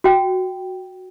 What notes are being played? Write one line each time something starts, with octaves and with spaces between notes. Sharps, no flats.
F#4 G5